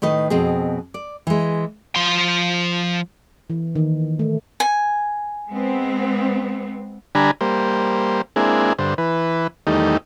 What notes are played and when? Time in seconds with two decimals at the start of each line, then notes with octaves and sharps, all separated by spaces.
0.02 A2 D#3 B4 D#5
0.30 F2 B2 C4 G#4
0.94 D5
1.27 E3 G#3
1.96 F3 C6
3.50 E3
3.75 D#3
4.19 A3
4.60 G#5
5.49 G#3 B3 C4
7.15 D3 G3 D4 G#5 A#5 B5
7.41 G3 A#3 C5
8.36 G#3 A#3 C4 D4 E4 G#4
8.79 G2 D3 C5
8.98 E3 B4
9.67 E2 D#3 G3 A3 D#4